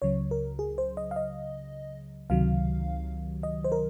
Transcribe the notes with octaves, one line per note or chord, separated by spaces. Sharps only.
C#2 C#3 F#3 C#5
A#4
G#4
C5
D#5
F5
D#5
C#2 C3 D#3 F#3 F5
D#5
C5
A#4